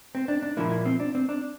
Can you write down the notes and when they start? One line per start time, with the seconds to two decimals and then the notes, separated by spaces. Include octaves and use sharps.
0.15 C4
0.28 D4
0.43 D4
0.57 A#2 F3 A#3 E4
0.72 E4
0.85 C4
1.00 D4
1.15 C4
1.29 D4